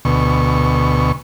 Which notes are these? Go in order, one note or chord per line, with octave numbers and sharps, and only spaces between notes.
D2 B2 C#6